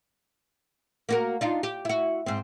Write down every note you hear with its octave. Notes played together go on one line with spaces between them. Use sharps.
A#3 F#4 A#4
D4 D#4 F4
G4
E4 F#4
G#2 C4